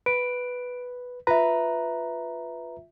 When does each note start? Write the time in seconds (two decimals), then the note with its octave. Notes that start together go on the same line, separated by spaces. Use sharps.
0.06 B4 D7
1.27 F4 B4 E5 A#5